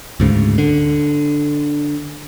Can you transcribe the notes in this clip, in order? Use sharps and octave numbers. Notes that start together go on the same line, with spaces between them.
D2 G#2 C#3
D3